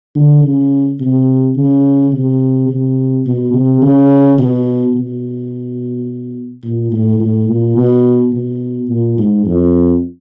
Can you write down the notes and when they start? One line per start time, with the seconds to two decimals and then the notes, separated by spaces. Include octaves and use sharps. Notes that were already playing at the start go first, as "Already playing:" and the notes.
0.15 D3
0.43 C#3
1.00 C3
1.56 C#3
2.13 C3
2.69 C3
3.26 B2
3.54 C3
3.82 C#3
4.38 B2
4.94 B2
6.64 A#2
6.92 A2
7.20 A2
7.49 A#2
7.77 B2
8.33 B2
8.89 A#2
9.18 G#2
9.45 F2